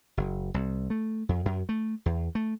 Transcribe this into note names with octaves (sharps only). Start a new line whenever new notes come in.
F#1
C2
A3
F2
F#2
A3
E2
A3